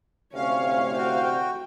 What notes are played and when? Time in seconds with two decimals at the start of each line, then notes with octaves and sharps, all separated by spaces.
0.35 D2 A2 C3 C#4 C#5 F5
0.98 F#4 G5